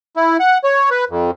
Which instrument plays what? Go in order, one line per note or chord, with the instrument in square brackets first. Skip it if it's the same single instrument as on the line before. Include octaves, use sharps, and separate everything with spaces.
[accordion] E4
F#5
C#5
B4
F2